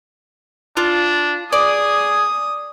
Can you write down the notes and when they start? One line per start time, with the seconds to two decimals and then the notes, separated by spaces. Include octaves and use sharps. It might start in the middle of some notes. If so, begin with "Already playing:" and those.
0.77 D4 F4
1.53 G#4 D5 D#6